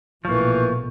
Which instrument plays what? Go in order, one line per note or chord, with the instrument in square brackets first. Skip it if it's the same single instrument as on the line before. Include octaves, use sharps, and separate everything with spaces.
[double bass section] A#1 B2 A3 [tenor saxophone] E3 [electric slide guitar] F3 A#3 [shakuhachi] C#6